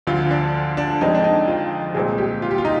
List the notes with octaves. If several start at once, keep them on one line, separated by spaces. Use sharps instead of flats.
D2 D3 F3 F4
D4
D4
F2 D#3 G#3 C4 D#4
D4
D#4
F4
C2 A#2 G#3 C4 G#4
G4
F4
G4
F4
D#4